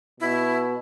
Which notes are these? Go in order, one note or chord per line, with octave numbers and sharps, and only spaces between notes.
B2 E4